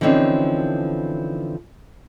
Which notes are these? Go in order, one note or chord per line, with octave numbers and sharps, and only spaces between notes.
D3 E3 F3 C4 C#4 D#4